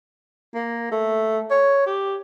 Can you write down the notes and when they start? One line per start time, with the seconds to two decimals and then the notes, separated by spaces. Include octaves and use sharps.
0.54 A#3
0.91 A3
1.50 C#5
1.86 G4